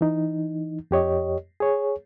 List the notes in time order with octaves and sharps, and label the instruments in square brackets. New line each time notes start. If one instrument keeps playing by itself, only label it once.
[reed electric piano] E3 D#4
F2 G4 C#5 D#5
G#4 C#5